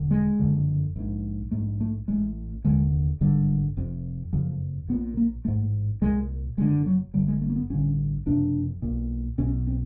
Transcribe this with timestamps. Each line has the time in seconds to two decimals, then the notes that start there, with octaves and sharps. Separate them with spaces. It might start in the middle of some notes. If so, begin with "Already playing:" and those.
Already playing: E1 D3
0.11 G#3
0.39 F#1 F2 D3
0.96 A#1 G#2
1.51 A#1 G#2 A3
1.81 A3
2.08 A1 A2 G#3
2.64 F1 D#2 D3 G#3
3.21 G#1 G2 D3 G3
3.77 F1 F2 C3
4.33 F#1 F2 C#3 F3
4.88 A#1 A#2 B3
5.17 A#3
5.45 A1 G#2 A3
6.01 C2 A#2 G#3
6.57 F#1 F#2 D3 G#3
6.86 F#3
7.14 G1 G2 D3 G3
7.28 G#3
7.41 A3
7.50 A#3
7.56 B3
7.70 A1 G2 D3 C#4
8.26 F#1 F2 C3 D4
8.82 B1 A#2
9.38 B1 B2 C#4
9.67 C4